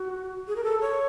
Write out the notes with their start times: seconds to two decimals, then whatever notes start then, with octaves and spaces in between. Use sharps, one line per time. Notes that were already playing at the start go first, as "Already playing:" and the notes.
Already playing: F#4
0.48 G#4
0.56 A#4
0.64 A4
0.81 C#5